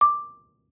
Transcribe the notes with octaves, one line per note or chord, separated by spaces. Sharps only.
D6